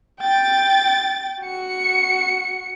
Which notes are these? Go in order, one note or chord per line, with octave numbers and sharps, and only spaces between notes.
G5 A6
F#4 C#7